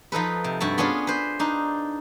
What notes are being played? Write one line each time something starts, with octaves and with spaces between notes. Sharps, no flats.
F3 D#4 A4 B4
C3
G2 F#4 E5 A5
B3 C#4 D4 F4 G#4
B4 C5
D4 D#4